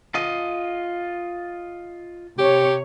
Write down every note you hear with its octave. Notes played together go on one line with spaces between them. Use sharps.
F4 D#5
C3 G4 C#5